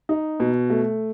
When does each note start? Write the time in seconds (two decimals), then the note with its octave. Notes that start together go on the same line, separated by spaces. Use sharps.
0.09 D#4
0.40 B2
0.70 A3